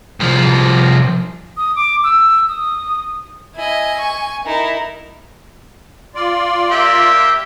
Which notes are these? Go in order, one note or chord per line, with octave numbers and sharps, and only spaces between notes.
C2 F3
D#6
D6
E6
D#6
E4 D#5 G#5
C#6
D#4 E4 A#4
F4 D5
A#3 G4 E5